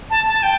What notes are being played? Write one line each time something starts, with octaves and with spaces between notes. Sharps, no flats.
A5
A5
G5